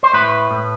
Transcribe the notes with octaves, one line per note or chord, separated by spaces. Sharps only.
C5
A2 B4
A2